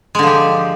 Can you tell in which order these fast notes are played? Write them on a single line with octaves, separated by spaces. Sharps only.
G#3 D3 F3 G4